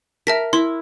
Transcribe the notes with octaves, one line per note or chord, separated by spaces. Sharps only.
A#4 E5 A5 B6
E4 C6